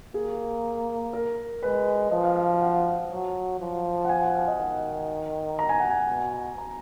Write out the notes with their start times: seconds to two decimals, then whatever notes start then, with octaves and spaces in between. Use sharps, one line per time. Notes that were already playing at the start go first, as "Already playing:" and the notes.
0.14 A#3 G#4
1.13 A#4
1.62 G#3 B4
2.11 F3 D#5
2.24 F5
2.36 F5
2.49 F5
2.61 F#5
3.11 F#3
3.60 F3
4.05 F#5
4.09 G#5
4.22 F#5
4.35 F5
4.48 D#5
4.59 D#3 F#5
5.59 A#5
5.69 G#5
5.80 F#5
5.90 G#5
6.08 B2
6.58 A#5